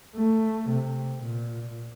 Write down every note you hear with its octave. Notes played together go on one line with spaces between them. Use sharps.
A3
C3
A#2